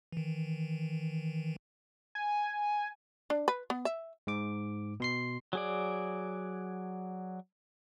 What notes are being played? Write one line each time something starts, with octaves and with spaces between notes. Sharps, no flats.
D#3 E3
G#5
D4
B4
B3
E5
G#2 D6
B2 C6 C7
F#3 G#4 D5